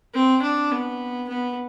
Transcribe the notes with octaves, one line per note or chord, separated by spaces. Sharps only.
C4
D4
B3
B3